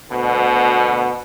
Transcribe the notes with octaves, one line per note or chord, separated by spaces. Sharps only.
D2 B2